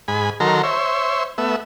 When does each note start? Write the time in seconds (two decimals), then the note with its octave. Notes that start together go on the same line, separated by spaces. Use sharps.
0.08 G#2 G#5 B5
0.40 D#3 F#3 A4 A#4 A#5 C6
0.63 C5 C#5 E5
1.38 A3 B3 E5